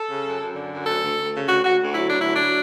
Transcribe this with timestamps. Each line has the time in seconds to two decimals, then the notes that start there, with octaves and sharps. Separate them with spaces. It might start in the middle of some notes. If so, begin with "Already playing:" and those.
Already playing: A4
0.09 C#3
0.24 F#2
0.40 F#2
0.55 D3
0.71 F#2
0.86 D2 A4
1.02 D2
1.17 D2
1.32 C#3
1.48 D2 F#4
1.63 D2 F#4
1.79 D2
1.94 F#3 E4
2.10 D2 D4
2.21 F#3 E4
2.34 D4
2.41 F#3